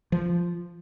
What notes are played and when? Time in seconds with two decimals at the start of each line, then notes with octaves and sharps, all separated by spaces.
0.12 F3